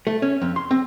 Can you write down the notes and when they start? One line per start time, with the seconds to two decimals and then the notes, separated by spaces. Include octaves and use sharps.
0.07 A3
0.22 C#4
0.42 F2
0.56 C6
0.71 C4